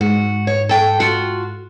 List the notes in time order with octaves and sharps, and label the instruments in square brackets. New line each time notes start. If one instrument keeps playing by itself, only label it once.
[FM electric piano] G#2 [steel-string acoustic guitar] F#4
[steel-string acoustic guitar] C#5
A4 G5
F4 F#4